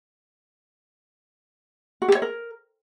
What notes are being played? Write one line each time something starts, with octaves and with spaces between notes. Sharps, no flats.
F#4
G4
C#5
A#4